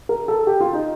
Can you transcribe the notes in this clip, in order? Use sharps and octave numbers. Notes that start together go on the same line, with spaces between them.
A#4
A4
G4
F4
D#4